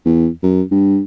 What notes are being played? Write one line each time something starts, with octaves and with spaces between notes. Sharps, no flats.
E2
F#2
G2